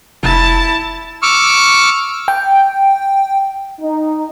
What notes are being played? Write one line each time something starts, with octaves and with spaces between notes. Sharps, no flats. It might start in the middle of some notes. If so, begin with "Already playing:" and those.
F1 E4 A5
C#6 D6 E6 F6
G5
D#4